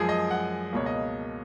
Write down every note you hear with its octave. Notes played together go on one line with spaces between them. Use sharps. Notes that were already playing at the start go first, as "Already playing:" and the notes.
Already playing: F#2 F3 G#3 G#4
D#5
F#5
C#2 B2 A#3 C#5
D#5